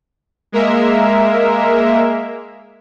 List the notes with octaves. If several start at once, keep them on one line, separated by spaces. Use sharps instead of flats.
G#3 A#3 A#4 E5